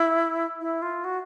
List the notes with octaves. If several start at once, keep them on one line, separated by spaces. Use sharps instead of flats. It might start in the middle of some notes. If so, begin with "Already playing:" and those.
Already playing: E4
E4
F4
F#4